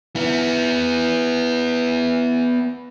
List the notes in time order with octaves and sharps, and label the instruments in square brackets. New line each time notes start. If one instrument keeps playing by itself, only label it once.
[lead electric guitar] B3 E4